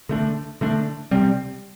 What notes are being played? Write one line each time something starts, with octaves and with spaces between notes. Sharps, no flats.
D3 A3 D4
D3 A3 D4
C3 G3 C4